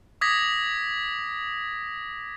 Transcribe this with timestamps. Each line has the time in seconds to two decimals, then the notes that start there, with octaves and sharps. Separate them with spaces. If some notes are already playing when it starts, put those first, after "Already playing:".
0.21 D6 D#6 G#6 A#6 B6